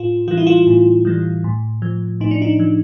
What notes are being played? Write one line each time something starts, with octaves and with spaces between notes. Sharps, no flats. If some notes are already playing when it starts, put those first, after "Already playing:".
Already playing: A2 F4
E3 G3 F4
E4
F4
A2
E3 G3
A2
F3
A2 D#4
D4
D#4
F3